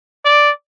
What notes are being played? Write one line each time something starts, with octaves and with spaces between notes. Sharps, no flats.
D5